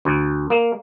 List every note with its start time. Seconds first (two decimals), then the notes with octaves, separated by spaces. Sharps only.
0.05 D2
0.50 A#3